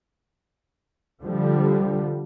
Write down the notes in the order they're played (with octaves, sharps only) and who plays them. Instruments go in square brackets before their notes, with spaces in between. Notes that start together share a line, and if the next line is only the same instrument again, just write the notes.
[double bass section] D3 F3 G3